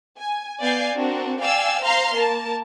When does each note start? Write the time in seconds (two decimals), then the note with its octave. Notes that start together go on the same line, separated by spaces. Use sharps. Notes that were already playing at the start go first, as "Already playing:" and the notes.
0.19 G#5
0.61 B3 D5 F5 G#5 G6 C7
0.95 C4 D4 F#4 A#4
1.40 D5 F5 G5 G#5 E6
1.82 C5 F5 A#5 C6 F6 C7
2.13 A#3 A#4 A5